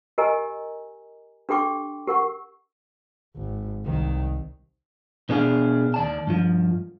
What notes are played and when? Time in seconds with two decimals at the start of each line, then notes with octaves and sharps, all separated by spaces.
0.18 G4 A#4 D#5 G#5 A#5
1.49 D4 G4 A4 G5 C6 D6
2.07 G4 A#4 F#5 C#6
3.36 G#1
3.85 C2 D#3
5.29 B2 B3 D4 G#4 A4 F5
5.94 D#2 D5 A5
6.27 G2 F3